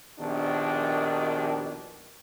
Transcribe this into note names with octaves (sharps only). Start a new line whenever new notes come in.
A#1 B2 D#3 D4 G4